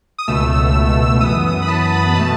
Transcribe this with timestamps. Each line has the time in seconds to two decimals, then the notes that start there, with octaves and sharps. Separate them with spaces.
0.18 D#6
0.28 C#2 B2 A3 E6
1.21 F#2 E3 B3 D#6
1.62 B5
1.68 A5
1.92 B5
2.08 B5
2.15 B2 A3 A5